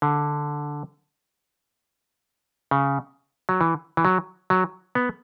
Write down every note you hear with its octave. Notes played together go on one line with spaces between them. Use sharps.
D3
C#3
F#3
E3
E3
F#3
F#3
B3